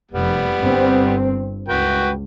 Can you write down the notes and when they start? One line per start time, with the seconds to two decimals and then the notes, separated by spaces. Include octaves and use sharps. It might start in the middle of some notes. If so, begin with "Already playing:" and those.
0.11 F1 G3 B3
0.58 G1 G2 C4
1.68 C#2 F#4 B4 G5